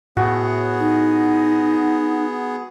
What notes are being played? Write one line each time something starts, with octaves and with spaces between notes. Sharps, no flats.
A2 B3 F#4 G#4
D#4